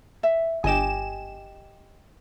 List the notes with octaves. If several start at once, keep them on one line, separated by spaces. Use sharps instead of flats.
E5
G1 G4 D#5 G#5 E7